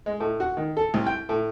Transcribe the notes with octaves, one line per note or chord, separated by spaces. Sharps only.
G#3
A2
F#4
D#3
A4
C2
G5
A2